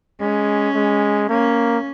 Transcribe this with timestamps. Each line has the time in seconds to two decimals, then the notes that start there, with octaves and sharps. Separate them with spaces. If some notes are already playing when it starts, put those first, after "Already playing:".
0.20 G#3 C#4
0.75 G#3
1.29 A#3 C#4